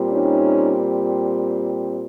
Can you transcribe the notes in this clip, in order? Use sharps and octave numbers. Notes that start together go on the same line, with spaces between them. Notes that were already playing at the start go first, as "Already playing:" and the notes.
Already playing: A#2 G3 C4
C#4 D#4